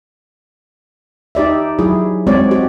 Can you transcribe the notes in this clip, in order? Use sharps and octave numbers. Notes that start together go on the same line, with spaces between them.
D#4 G4 D5 E5
F#3 E4 G#4
G#3 C4 F#4 C#5 D5
F#4 G4